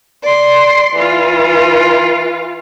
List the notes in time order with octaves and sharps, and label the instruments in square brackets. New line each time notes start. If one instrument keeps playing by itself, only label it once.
[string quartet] D5 C6
E3 F4